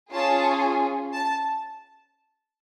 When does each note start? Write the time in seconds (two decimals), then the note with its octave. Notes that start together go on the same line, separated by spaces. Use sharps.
0.11 C#4 F4 G#4 A5
1.13 A5